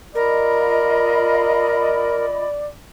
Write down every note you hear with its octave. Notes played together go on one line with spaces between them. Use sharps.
F4 A#4 D5 D#5 B5